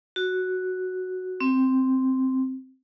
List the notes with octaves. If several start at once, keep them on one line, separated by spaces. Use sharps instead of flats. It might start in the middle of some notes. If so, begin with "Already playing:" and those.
F#4
C4